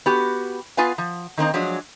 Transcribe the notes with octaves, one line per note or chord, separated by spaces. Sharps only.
B3 F#4 G4
B3 F4 B4 F5 G#5
F3
D#3 A#3 C4 D#4
F3 F#3 G#3 D4